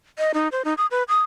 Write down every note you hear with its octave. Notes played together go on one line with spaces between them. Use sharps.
D#5
D#4
C5
D#4
D#6
B4
D#6